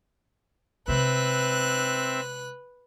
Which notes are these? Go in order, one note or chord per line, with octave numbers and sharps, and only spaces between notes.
C3 G#3 C4 B4 E5 F#6